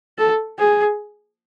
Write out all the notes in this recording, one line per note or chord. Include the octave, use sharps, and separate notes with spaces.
A4
G#4